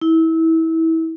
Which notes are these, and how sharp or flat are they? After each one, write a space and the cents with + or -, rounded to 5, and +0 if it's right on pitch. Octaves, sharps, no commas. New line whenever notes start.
E4 -25